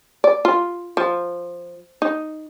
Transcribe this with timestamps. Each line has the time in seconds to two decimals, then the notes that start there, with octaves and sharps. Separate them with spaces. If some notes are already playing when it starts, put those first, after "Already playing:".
0.24 D5
0.45 F4
0.97 F3
2.02 D#4